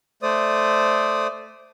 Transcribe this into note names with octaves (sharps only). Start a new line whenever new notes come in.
A3 C5 D5 D#6